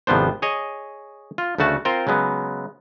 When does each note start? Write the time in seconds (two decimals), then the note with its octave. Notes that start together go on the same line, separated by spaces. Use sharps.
0.07 G#1 C3 F3 B3 D4 C5
0.42 G#4 C#5 D#5
1.38 F4
1.58 D2 C#3 A3 F#4 A5
1.85 C4 F4 A#4 C5
2.07 C#3 F#3 G#3 B3